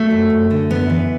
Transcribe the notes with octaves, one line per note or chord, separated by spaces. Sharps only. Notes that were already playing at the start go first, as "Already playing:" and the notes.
Already playing: F#3 A3
F#2
F#2
D3
F#2 B3
E3